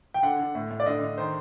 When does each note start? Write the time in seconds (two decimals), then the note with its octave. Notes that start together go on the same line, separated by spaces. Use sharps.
0.14 G5
0.23 D3 F#5
0.39 D3
0.55 A2
0.70 A2
0.80 D5
0.86 D3 D#5
1.01 D3
1.18 D#3 C5